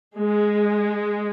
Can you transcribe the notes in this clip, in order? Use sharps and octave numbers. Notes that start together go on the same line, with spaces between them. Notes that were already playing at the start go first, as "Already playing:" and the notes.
G#3